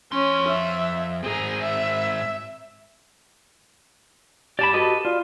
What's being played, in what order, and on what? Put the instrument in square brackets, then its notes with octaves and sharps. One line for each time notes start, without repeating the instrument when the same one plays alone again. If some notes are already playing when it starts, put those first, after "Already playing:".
[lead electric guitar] F2 C6 [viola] C#4
[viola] E5
[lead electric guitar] G#2 C4 [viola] G#4 A#5
[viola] E5
[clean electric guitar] G4 A5 [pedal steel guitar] D5 B5 [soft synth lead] D7
[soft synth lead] F#4 [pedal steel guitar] A4 B4 D#5
[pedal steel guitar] F4 [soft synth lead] D5